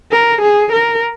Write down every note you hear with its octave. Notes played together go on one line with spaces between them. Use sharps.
A#4
G#4
A#4